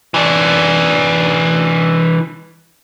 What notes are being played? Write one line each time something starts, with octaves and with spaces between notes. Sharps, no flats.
E3 D4